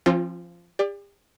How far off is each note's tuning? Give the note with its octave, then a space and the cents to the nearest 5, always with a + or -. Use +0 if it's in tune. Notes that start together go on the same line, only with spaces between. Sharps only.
F3 -15 C4 +40 F4 +10
G4 +40 D5 +0